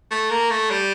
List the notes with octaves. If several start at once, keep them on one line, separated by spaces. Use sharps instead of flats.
A3
A#3
A3
G3